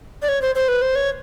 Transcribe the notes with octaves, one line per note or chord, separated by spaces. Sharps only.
D5
C#5
C5
C5
B4
C5
C#5